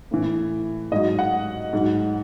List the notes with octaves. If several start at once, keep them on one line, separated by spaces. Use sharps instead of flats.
A2 E3
G#2 F#3 D#5
F#5
G#2 F#3